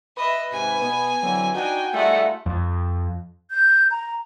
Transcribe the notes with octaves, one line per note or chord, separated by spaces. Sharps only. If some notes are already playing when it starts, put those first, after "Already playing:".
B4 D#5 E5
G#2 C3 G#5
B2 B3
D3 E3 F#3 C4
D4 D#4 F#4 G5 G#5
G3 A3 D#4 F4 G#4 A4 F#5
F2
G6
A#5